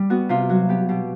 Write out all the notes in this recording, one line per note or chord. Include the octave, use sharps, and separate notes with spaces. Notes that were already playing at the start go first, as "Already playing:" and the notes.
Already playing: G3
B3 F#4
C3 F4
F#3 F#4
B3 G4
B2 G4